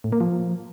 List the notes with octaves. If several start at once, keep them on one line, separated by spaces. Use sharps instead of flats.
A2
A#3
F3